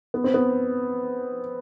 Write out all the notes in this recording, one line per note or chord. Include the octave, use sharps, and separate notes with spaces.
B3
C4
B3